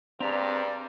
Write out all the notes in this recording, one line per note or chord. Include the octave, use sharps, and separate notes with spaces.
G2 C4 G4 G#4 D5 A#5